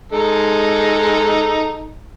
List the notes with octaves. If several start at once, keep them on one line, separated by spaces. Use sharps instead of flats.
G#3 D#4 A4